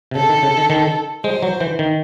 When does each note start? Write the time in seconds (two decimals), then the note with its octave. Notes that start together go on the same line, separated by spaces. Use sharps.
0.11 C3
0.15 C#3 A4
0.29 D#3
0.43 C#3
0.57 D#3
0.70 D#3
1.24 G#3 C5
1.42 F#3
1.60 E3
1.79 D#3